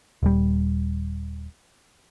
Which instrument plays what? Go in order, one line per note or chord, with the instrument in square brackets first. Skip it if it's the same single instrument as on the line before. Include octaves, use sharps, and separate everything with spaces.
[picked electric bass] D#1 G3